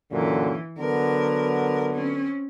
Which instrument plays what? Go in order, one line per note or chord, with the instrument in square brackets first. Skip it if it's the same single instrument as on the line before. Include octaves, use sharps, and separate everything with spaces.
[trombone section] F#2 A#2 D3 [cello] E3
[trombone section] D3 F#3 B3 [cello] A#4
[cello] C4 C#4